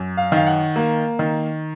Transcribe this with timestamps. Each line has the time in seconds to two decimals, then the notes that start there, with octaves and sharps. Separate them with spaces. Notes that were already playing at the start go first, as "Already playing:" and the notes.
Already playing: F#2
0.17 F5
0.32 D#3 F5
0.47 F#5
0.76 A#3
1.19 D#3